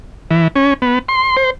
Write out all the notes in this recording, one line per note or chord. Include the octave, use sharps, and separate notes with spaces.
E3
C#4
B3
C6
C5